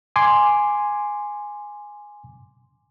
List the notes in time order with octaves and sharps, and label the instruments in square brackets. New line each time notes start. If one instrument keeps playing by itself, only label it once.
[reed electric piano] G#5 C6 D6